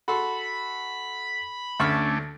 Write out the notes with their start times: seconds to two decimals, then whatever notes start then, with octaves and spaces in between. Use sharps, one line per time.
0.08 F#4 A4 B5 C6
1.80 D2 A3 C#4 D4 C#6 F6